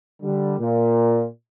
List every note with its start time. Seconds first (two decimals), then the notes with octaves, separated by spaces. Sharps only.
0.22 D3 G3
0.59 A#2